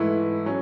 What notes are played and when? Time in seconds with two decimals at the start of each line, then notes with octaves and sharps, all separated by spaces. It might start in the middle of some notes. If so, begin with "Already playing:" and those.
Already playing: G#2 E3 A3 E4
0.46 F#3 C#4